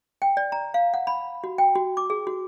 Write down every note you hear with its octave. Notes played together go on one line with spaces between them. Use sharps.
G5
D5
A#5
F5
F#5
B5
F#4
G5
F#4
D6
G#4
F#4